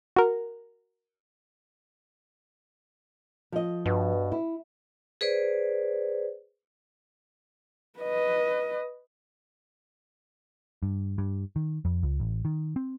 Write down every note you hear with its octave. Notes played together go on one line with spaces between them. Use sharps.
F#4 A#4
F3 D#5
G2 B2
E4
G#4 B4 C5 D5
B4 D#5
G2
G2
D#3
F2
C#2
A1
D#3
C4